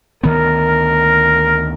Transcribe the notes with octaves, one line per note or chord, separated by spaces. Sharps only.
D2 D#3 B3 A#4